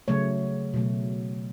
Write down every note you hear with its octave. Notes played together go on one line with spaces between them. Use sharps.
C#3 F#3 A3 C#5
B2 F#3 A3